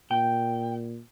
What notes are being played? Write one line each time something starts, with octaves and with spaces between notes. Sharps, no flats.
A#2 G5